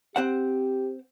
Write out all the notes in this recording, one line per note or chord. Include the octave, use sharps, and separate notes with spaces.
C4 G4 C5 F#5